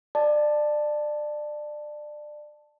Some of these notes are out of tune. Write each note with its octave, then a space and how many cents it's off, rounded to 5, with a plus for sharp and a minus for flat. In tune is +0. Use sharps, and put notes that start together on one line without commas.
D5 +25 A5 +0